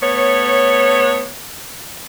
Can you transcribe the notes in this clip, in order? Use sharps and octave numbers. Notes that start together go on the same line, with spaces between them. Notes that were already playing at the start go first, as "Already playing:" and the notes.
A3 B3 C#5